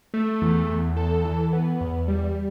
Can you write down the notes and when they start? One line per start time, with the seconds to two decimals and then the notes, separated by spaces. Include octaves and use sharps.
0.14 A3
0.42 E2
0.69 E2
0.97 A4
1.25 E3
1.53 B3
1.81 E2
2.08 G3